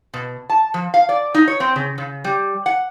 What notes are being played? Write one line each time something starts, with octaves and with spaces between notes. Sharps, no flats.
B2
A5
F3
F5
D5
D#4
C#5
C4
C#3
C#3
G3
F#5